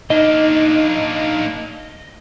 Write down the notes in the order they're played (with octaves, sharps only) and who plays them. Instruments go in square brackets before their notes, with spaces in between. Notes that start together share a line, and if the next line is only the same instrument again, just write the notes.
[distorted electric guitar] A#3 D4 [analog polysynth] D#4 [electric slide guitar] D#5